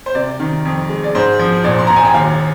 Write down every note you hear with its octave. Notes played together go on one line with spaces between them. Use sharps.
C5
C3 D5
D#3
F2
G#3
D5
G#2 C5
F3
A#1 D5
C6
A#1 A#5
G#5
G5
D#2 F5